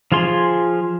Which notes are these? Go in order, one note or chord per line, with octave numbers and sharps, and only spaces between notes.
F3 F4 G#4 C6